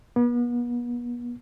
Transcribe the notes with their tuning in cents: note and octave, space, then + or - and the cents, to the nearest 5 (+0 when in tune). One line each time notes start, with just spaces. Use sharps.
B3 -40